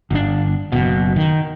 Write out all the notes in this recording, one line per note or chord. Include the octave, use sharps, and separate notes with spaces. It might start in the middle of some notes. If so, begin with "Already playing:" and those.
G1 D4
F#1 B2
D#3